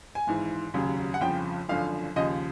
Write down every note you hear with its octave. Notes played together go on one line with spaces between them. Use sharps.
G#5
G#1 G#2 E3
F1 D#2 C#3 F#3
F#5
G1 F2 C#3 F3 G5
G#1 F#2 D3 F3 F5
D#2 C#3 F3 D#5